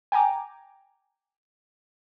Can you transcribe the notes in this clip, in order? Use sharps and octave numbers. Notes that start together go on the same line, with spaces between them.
G5 G#5 A#5 D6